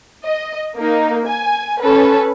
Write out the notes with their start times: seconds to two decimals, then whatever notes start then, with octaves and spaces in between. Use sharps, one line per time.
0.23 D#5
0.76 A#3 D#4
1.26 G#5
1.80 C#4 A4 B4